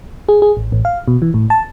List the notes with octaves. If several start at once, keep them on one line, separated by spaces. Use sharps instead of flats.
G#4
G#4
A1
A1
F5
B2
E3
A2
A5